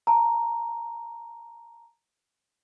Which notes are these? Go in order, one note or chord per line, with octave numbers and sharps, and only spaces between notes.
A5 A#5